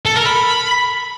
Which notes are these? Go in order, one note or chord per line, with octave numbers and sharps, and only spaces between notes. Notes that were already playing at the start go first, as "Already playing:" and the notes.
A4
A#4
B5